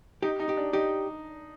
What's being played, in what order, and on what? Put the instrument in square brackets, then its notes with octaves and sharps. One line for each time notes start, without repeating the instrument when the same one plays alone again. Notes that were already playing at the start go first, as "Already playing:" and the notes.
[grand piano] D#4 [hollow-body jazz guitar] G4
[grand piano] D#4
[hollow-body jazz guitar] G4
[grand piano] D4
[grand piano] D#4 [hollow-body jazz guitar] G4